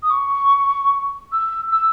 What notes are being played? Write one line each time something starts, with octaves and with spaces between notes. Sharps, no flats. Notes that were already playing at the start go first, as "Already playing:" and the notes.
D#6
C#6
E6
E6